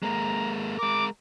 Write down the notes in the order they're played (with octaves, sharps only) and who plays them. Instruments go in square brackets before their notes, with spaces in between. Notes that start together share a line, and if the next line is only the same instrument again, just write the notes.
[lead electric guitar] G#3 A#3 [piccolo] A#5
[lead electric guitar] G#3 A#4 [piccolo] D6